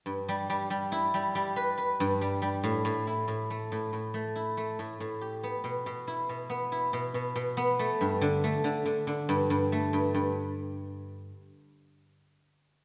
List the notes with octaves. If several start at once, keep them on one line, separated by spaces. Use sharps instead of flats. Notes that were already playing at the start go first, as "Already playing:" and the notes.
G2
G3
G3
G3
E4
G3
G3
B4
B4
G2
G3
G3
A2
A2
E4
A2
A3
A2
A2
A3
E4
A3
A2
A2
G4
B3
B2
B2
E4
B2
B3
E4
B2
B2
B2
B3
A3
G2
D3
A3
D3
D3
D3
G2
G2
A3
G2
G2